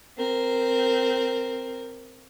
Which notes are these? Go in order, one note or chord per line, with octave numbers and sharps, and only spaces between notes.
C4 A#4